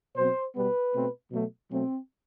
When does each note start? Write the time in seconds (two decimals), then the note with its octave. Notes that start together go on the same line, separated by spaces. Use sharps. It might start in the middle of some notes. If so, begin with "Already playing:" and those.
0.17 B2 F#3 C4 C5
0.55 B2 G3 B3 B4
0.93 B2 A3 C4
1.31 B2 F#3 A3
1.70 B2 F#3 A3 C4